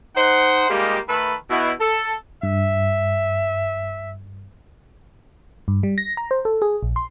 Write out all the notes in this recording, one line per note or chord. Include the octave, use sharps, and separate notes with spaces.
D#4 C5 F#5
G3 G#3 A#3 D#4 F4 G4
D#3 A3 A4 B4 B5
B2 E4
A4
G2 E5
G2
G3
A#6
A#5
C5
A4
G#4
A#1
C6